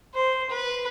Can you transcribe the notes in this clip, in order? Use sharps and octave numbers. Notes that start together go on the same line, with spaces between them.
C5
B4